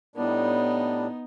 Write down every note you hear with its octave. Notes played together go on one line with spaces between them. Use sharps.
A2 G3 B3 D4 D#4